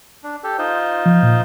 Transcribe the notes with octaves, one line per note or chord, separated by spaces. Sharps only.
D4
G4 A4
D#4 F4 C5
F3
A#2